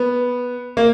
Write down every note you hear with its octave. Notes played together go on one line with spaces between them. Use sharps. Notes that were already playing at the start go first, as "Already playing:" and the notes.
Already playing: B3
A#3